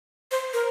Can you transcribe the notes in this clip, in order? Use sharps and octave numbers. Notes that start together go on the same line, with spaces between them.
C5
A#4